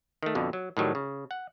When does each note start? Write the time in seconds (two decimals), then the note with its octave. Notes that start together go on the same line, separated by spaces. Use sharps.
0.23 D#3 A3
0.35 F2 B2 D3
0.53 F#3
0.77 A2 D#3 F#3 G3
0.95 C#3
1.31 F#5